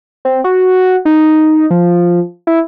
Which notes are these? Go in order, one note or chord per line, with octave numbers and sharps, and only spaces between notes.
C4
F#4
D#4
F3
E4